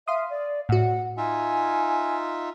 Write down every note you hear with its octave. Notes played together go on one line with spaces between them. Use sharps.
E5 F5 C6 D#6
D5
A2 F#4 F#5
D#4 F4 E5 G#5